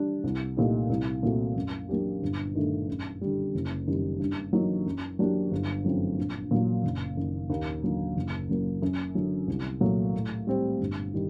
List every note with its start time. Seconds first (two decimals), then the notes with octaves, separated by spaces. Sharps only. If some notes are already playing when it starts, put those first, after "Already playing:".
Already playing: G3 D4
0.24 C2
0.57 A#2 A3 D#4 G4
0.90 C2
1.23 A#2 A3 C4 F#4
1.56 F#2
1.89 F#3 A#3 D4 G4
2.22 G1
2.55 G2 D#3 A3
2.88 F#2
3.21 D3 G3
3.54 F#1
3.87 F#2 D#3 G3
4.19 G2
4.53 F#3 A#3 D#4
4.86 F#2
5.19 F#3 A#3 D4 G4
5.51 G1
5.85 F#2 F#3 A3 C4
6.18 A#1
6.51 A#2 F#3
6.84 F#1
7.17 F#2 D#3
7.50 D#2
7.83 D3 F#3 A#3 D#4
8.16 F#1
8.49 F#2 F#3 A#3
8.82 F#2
9.15 D3 F#3
9.48 C2
9.81 A#2 F#3 A3
10.14 A2
10.47 G3 C4
10.80 G1
11.14 D#3 G3